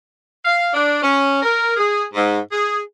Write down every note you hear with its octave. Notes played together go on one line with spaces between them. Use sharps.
F5
D4
C#4
A#4
G#4
G#2
G#4